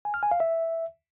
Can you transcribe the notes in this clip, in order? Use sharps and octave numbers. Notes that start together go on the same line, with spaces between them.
G#5
F6
G#5
F5
E5